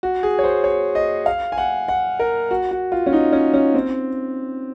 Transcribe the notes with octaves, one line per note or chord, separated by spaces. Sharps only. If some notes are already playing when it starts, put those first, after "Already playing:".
F#4
G#4
C#5
C5
C#5
D#5
F5
G#5
F#5
F#5
A#4
F#4
F#4
F4
C#4
D#4
C#4
C#4
C4